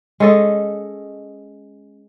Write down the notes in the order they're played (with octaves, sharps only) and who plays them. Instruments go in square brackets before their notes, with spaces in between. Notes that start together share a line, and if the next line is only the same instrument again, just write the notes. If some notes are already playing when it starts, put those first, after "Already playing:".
[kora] G#3 C#4 A4 D#5